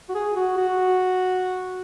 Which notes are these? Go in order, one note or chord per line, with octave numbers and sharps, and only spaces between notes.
F#4
G#4
F#4
F#4